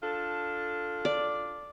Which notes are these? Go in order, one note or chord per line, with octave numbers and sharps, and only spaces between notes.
D4 F4 A4
D5